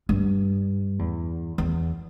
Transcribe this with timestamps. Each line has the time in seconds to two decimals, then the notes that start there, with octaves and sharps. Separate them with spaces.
0.09 G2
0.99 E2
1.58 E2